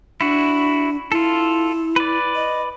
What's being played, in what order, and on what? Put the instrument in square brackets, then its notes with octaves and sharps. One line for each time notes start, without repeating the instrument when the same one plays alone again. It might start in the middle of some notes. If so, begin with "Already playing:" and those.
[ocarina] D4 [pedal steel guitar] E4 F#4
[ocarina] E4 [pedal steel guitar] F4 A4
[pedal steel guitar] B4 D5
[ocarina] D#5